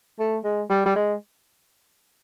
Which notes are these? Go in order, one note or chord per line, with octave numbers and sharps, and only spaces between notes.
A3
G#3
G3
G3
G#3